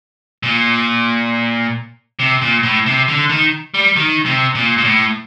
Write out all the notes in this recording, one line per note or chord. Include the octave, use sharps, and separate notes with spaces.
A#2
C3
A#2
A2
C3
D3
D#3
G3
D#3
C3
A#2
A#2
A2